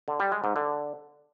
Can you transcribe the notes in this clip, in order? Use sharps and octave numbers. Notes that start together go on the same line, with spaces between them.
D3
G3
G#3
G#2
D3